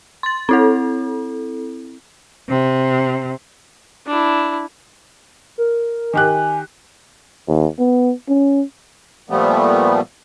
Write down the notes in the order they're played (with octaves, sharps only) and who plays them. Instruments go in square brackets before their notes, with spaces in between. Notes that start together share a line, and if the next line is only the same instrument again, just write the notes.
[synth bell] C6 A6
C4 E4 A4
[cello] C3
[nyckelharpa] D4 E4
[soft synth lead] A#4
[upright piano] D#3 G4 F#6 [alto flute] G#5
[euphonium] D#2
B3
C#4
[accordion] A#2 F3 G3 A3 B3